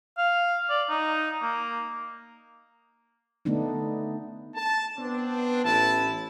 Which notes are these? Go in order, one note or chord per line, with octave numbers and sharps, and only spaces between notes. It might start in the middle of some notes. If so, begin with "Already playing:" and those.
F5
D5
D#4
A#3
D3 A3 B3 D4 D#4
A5
B3 C4 D4
A1 E4 A5